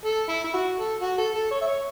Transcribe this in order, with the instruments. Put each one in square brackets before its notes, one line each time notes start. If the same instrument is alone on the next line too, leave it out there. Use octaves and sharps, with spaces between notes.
[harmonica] A4
E4
E4
F#4
A4
F#4
A4
A4
C#5
E5
C#5